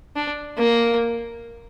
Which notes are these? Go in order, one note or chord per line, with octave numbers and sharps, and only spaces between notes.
D4
A#3